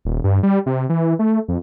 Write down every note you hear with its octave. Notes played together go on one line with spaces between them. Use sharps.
D#1
G2
G3
C3
E3
A3
F2